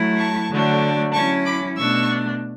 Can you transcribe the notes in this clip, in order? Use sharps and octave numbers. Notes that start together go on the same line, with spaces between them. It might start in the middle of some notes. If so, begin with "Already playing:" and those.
Already playing: F#3 A3 E4
A5 C#6
D3 F#3 A3 D4
F#3 C#4 E4 A5 C#6
B5 D6
B2 A3 D4 C#6 E6